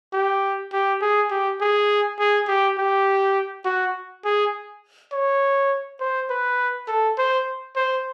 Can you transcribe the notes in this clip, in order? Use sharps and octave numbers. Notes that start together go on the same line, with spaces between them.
G4
G4
G#4
G4
G#4
G#4
G4
G4
F#4
G#4
C#5
C5
B4
A4
C5
C5